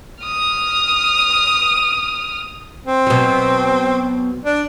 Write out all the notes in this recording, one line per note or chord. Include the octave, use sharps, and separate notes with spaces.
D#6 F6
C4
B2 F#3
D4